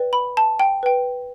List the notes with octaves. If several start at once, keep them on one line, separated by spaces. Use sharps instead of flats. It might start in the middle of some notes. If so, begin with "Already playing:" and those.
Already playing: B4 D5 G5
B5
A5
G5
B4 G5